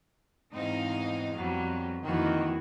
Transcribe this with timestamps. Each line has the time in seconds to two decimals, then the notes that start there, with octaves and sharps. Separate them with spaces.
0.53 E2 G#2 C4 D#4 F5
1.37 F2 F#3 G3 B3
2.04 F2 D#3 E3 A#3 F#4